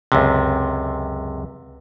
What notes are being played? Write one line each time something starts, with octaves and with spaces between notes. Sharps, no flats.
C#2 F#2 C3